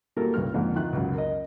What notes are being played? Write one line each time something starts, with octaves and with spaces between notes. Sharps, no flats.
G3 A#3 E4 F#4 A4 A#4
C#2 G2 F6
F2 G#2 D3 A#3
D#3 F4 E5 F#6
C#2 F#2
A#4 D#5